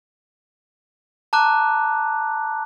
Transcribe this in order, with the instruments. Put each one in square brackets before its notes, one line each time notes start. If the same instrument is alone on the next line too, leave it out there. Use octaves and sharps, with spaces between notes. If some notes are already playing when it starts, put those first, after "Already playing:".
[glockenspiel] A5 A#5 D6 F#6